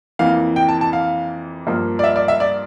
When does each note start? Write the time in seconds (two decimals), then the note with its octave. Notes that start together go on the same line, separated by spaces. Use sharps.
0.19 F2 E3 A#3 F5
0.56 G5
0.69 A5
0.81 A5
0.93 F5
1.67 G2 F3 A#3
1.99 D5
2.04 E5
2.16 D5
2.28 E5
2.40 D5